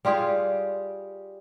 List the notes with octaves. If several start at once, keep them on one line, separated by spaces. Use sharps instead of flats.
G3 F4 G4 G#4